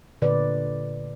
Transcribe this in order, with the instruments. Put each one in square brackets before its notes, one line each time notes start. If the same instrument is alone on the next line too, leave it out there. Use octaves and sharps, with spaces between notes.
[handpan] A#2 D3 B4 D5